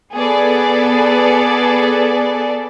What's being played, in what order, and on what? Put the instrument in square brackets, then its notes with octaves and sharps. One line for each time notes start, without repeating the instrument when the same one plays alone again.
[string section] B3 G#4 A4 B4 D5